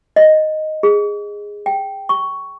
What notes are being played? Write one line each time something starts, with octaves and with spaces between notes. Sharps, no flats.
D#5
G#4
G5
C#6